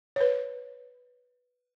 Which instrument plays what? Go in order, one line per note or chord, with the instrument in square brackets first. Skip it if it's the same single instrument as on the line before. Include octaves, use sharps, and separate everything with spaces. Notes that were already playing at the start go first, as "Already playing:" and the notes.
[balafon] B4 C#5